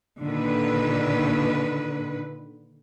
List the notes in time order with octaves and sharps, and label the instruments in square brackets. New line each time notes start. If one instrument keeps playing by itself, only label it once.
[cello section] A#2 D3 D#3 B4